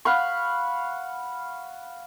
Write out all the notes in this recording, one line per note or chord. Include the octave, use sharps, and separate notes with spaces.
F5 F#5 B5 C#6